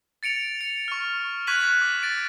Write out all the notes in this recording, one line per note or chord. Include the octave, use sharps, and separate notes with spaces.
A6 C#7 D7 F7
C#7 D7
C#6 F6
C#6 F#6 G#6 B6 D#7 F#7
D6
A6 D7